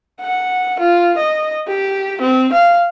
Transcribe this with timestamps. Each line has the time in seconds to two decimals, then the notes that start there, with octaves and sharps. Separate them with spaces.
0.21 F#5
0.80 F4
1.17 D#5
1.67 G4
2.21 C4
2.53 F5